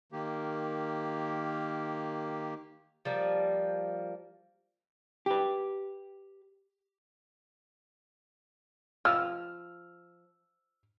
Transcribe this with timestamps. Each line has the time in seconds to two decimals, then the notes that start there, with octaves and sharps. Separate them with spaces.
0.12 D#3 A#3 G4
3.05 F3 G3 A#3
5.26 G4 B4
9.05 F3 E6 F6